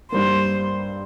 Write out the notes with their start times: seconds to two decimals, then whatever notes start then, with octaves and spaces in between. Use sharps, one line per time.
0.12 G2 G3 A#3 C5